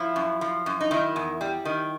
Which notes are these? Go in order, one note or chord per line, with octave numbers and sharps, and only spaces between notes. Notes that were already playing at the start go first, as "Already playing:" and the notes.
Already playing: F3 E4
F#2
F3
F#2
D#4
D#3 E4
E2
G3
D#3